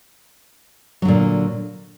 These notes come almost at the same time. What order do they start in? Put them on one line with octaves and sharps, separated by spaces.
F#3 D3 A#2